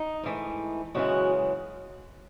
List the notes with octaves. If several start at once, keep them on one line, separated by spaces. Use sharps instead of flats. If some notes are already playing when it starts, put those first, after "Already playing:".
Already playing: D#4
G#2 E3 A3
F#2 C#3 E3 G#3 F#4